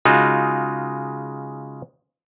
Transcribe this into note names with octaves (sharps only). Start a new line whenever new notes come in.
C#3 G#3 D#4 F4 F#4